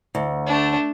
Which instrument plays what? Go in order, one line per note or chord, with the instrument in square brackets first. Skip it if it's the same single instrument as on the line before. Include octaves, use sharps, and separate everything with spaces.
[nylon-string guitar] D2
[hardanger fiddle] A3 D4